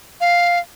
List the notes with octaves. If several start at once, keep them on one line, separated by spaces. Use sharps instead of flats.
F5